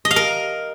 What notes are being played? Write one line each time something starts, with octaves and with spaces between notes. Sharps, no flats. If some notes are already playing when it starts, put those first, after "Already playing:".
D#5
F5
A#4